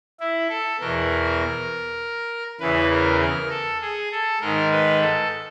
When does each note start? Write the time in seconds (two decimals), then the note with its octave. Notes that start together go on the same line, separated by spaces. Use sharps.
0.20 E4
0.49 A4
0.80 E2 B2 A#4
2.60 E2 C#3 E3 B4
2.90 A#4
3.21 A#4
3.50 A4
3.81 G#4
4.12 A4
4.41 G#2 D#3 A#4
4.71 B4
5.01 A4